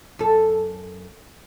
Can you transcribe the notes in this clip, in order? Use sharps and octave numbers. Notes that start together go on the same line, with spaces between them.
F#2 A4